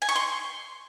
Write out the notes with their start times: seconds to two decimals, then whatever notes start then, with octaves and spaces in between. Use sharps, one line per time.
0.02 G#5
0.09 C#6
0.16 C6